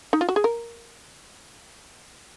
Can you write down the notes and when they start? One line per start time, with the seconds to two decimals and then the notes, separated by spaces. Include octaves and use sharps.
0.13 D#4
0.21 F4
0.29 F#4
0.36 G#4
0.44 A#4